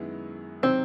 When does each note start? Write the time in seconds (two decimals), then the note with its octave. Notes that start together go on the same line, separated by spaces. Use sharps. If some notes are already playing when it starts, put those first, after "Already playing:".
Already playing: F#2 D#3 G#3 B3 E4
0.63 C3 D#3 F#3 C4